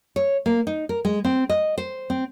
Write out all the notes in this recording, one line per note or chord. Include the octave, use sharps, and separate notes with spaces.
C#5
A#3
D#4
A#4
G#3
C4
D#5
C5
C4